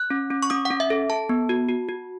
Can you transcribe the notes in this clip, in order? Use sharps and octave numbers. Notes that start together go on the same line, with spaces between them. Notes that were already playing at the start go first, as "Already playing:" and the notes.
Already playing: F#6
C#4
C#4
C#6
C#4 D#6
F#5
C#4
E5
A4
A4 A5
B3
F#4
F#4
F#4